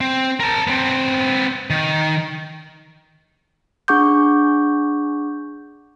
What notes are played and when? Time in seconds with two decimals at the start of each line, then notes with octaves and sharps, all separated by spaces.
0.01 C4
0.40 A#4 A5
0.67 B3 C4
1.70 D#3
3.88 D4 G#4 F#5 C#6 D6 G6